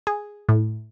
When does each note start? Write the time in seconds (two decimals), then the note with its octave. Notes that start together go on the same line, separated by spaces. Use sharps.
0.07 G#4
0.49 A2